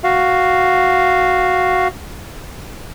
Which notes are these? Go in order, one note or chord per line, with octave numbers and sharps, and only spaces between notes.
F#4 F5